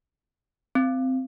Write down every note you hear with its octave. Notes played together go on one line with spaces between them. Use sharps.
C4